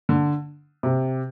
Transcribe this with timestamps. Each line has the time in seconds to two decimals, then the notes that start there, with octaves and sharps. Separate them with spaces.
0.09 D3
0.83 C3